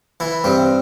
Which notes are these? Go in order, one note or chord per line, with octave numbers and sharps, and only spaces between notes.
E3 E4
G2 C4